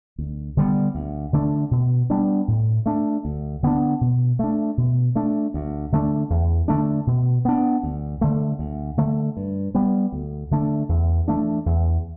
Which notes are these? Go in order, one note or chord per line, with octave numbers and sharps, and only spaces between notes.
D2
D3 G3 B3
D2
D3 A3 D4
B2
G3 B3 D4
A2
A3 D4
D2
D3 B3 D4
B2
A3 D4
B2
A3 D4
D2
D3 A3 D4
E2
D3 A3 D4
B2
B3 D4
D2
D3 A3
D2
D3 A3
G2
G3 B3
D2
D3 A3 D4
E2
E3 A3 D4
E2